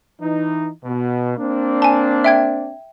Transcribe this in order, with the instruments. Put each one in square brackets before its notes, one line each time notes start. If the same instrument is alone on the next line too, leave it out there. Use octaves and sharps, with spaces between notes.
[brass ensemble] E3 D#4
B2
A#3 C4 D4
[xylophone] G#5 A5
E5 G5 G#6